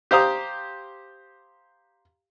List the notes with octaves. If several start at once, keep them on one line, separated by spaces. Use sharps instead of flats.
G4 C5 F5 A#5 D#6